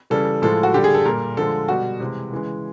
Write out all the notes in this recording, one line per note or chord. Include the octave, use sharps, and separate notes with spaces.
C#3 E3 G3 A4
A2 F3 G#3 A4
F#4
D3 G3 G4
G#4
A4
A#2 G3 A#4
D3 F3 G#3 A4
B2 G3 F#4
C3 E3 G#3
C#3 E3 G#3